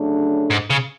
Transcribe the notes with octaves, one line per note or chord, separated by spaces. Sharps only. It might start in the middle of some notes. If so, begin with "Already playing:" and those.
Already playing: C#3 F#3 A3 D4
G#2
C#3